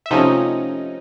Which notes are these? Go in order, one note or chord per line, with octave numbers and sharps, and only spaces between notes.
E5
C3 F3 A3 C#4 D#4 D#5